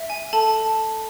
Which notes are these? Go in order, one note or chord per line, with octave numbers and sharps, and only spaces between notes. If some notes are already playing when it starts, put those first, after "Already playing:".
Already playing: E5
G#5
A4 A5